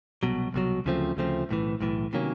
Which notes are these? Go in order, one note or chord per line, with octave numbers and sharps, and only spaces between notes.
C2 B2 F#3
C2 B2 F#3
D2 C#3 F3 A3 C4
D2 C#3 F3 A3 C4
B1 A2 E3
B1 A2 E3
C3 D#3 F#3 A#3 C#4